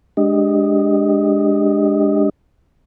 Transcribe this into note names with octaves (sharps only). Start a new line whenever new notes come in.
G#3 D4 G4 D#5